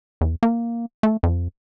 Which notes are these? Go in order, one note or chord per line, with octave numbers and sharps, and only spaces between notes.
E2
A#3
A3
F2